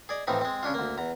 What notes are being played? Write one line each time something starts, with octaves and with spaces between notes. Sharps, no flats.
G#4 D5 D#5
A2 E3 F3 C4 D#4
G#3 C4
C#3 C#4 D4 F4
D2 A#3
E2 A#5